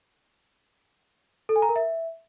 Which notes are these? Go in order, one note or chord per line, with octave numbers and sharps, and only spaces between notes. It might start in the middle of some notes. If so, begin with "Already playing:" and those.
A4
G#5
A#5
A#4
E5